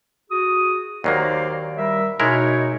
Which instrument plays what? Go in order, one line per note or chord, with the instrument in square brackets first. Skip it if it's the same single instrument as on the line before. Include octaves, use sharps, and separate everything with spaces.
[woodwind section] F#4 G#4 D#6
[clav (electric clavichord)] D#2 F#3 A#3 [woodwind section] C5 D5 F5
[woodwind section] G3 A#4 E5
[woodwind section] B2 D#4 C#5 [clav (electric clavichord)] G#3 E4 A#4